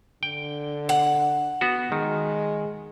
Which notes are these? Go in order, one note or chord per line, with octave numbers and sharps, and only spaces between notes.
D3 G5
F#5
B3 F#4
D#3 G#3